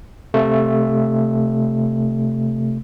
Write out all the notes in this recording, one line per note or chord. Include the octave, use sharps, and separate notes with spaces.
C3 A3